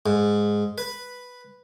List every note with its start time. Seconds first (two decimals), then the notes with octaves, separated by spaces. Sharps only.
0.06 G#2
0.78 B4